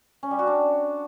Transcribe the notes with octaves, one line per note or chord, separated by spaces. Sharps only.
C#4
G3
F#4
D4